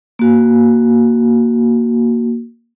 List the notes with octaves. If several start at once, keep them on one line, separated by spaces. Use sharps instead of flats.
A#3 F#4